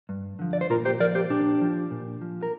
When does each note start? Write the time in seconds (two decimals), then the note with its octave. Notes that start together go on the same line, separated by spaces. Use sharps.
0.09 G2
0.39 D3 F3
0.53 D5
0.61 C5
0.70 A#2 F4 A#4
0.85 G4 C5
1.00 F3 A#4 D5
1.15 G4 C5
1.30 A#2 D4 G4
1.61 F3
1.91 A#2
2.21 F3
2.43 A#4